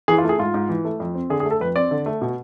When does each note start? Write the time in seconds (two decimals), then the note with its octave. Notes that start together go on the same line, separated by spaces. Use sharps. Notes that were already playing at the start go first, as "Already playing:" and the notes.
0.08 E3 G#4
0.18 F4
0.24 A3
0.29 G#4
0.39 G#2 F4
0.54 G#2
0.69 E3
0.85 A3
1.00 F2
1.15 C4
1.30 D3 G#4
1.40 G#4
1.45 A3
1.51 A4
1.60 F2 B4
1.76 C4 D5
1.91 D3
2.06 A3
2.21 B2